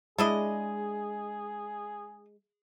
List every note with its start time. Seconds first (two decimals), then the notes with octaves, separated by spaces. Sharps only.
0.18 G#3 D4 E4 G#4 D#5